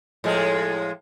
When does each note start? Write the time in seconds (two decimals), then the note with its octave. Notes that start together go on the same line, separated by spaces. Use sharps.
0.24 A2 F3 G#3